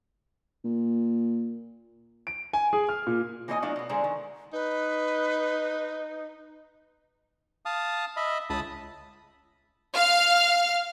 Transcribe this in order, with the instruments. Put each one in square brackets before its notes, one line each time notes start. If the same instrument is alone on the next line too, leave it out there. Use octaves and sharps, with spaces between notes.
[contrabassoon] A#2
[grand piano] D7
G#5
G#4
F6
A#2
[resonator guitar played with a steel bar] E3 A#3 D#4 C#5 D#5 G#5
F#3 A3 D4 E4 F5
B2 B3
D3 G#3 D4 G#4 C5 A#5
D#3
[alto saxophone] D#4 [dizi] B4
[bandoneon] F5 A5 D#6
D#5 E5 B5
[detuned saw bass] C#2 [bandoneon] A5 B5 D#6
[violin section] F5 F6